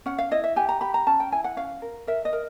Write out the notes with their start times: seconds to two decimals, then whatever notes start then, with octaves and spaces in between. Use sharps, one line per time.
0.06 C#4 F#5
0.18 F5
0.31 E4 D#5
0.44 E5
0.56 G4 G#5
0.69 A#5
0.81 G4 B5
0.94 A#5
1.07 C#4 A5
1.20 G5
1.32 E4 G#5
1.44 F#5
1.57 C#4 F5
1.82 A#4
2.07 A#4 E5
2.25 D#5
2.33 A#4